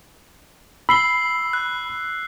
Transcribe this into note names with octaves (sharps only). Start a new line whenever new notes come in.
B5 E6 C7 G7
F#6